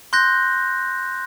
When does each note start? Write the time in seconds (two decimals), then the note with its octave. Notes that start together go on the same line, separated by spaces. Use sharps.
0.13 C6 F#6 G6 A#6